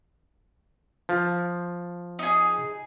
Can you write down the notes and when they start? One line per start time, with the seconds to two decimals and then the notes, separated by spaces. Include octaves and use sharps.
1.09 F3
2.19 D#4 G#4